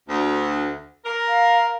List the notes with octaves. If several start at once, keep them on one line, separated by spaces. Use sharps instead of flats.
D2
A#4
F5